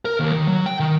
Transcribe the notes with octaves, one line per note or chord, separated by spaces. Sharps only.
A#4
D#2
D#3
F#3
G5
D#3